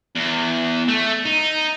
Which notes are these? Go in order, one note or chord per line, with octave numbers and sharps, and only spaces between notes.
E2
A3
D#4